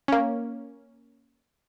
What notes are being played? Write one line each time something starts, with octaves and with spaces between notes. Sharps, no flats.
A#3 C#4